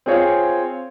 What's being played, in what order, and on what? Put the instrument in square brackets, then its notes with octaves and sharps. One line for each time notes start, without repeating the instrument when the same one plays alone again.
[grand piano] C4 F4 G#4 C#5 F5